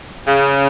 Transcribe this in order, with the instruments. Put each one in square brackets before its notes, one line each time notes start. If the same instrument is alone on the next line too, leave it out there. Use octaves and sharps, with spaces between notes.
[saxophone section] C#3